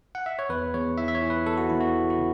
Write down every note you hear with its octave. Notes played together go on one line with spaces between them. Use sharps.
F#5
E5
C#5
E2 B4
E2 C#5
E3 E5
E5
C#5
E3
B4
E2 A4
F#4
E2 E4
F#4
E2
F#4
C#3